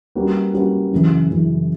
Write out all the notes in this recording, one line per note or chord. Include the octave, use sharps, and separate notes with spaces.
G3 A#3 C#4 F#4 B4
G3 A#3 C#4 F#4 B4
F#2 C#3 E3
F#2 C#3 E3